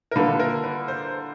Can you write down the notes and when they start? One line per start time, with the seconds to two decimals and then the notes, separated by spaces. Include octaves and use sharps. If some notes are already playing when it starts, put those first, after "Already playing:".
0.11 A#4
0.16 D3 G3 A#3 D4 F4 B4
0.28 B4
0.39 A#4
0.64 B4
0.88 C5